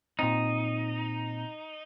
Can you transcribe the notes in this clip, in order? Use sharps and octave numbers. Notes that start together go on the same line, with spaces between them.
A#2 C4 D#4